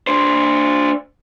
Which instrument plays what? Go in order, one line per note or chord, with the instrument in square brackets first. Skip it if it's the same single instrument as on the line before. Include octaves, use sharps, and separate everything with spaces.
[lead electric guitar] D4 C5